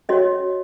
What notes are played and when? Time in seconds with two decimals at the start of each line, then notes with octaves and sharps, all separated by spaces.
0.09 C#4 F#4 C#5 D#5